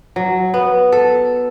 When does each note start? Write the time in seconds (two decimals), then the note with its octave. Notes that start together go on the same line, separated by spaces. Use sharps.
0.16 F#3
0.54 B3
0.92 A4